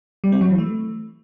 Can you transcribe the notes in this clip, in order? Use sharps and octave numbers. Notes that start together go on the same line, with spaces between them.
G3
C4
F#3
E3
A3